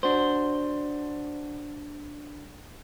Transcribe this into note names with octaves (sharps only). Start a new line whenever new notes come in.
D4 F#4 C5